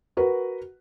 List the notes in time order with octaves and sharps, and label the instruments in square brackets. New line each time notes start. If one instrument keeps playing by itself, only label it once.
[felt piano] F#4 A#4 B4